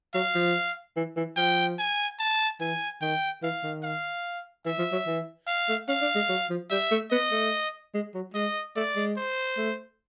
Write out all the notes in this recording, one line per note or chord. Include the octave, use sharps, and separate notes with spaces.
F#3 F5
F3
E3
E3
F3 G5
G#5
A5
E3 G#5
D#3 G5
E3 F5
D#3
F5
E3 E5
F3
F#3
E3
F5
A3
C#4 F5
D4
G#3
F#3
F3
G3 E5
A3
B3 D#5
A3
G#3
F#3
G#3 D#5
A3 D5
G#3
C5
A3